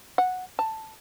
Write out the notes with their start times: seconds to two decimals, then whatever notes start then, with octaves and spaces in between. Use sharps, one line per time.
0.18 F#5
0.59 A5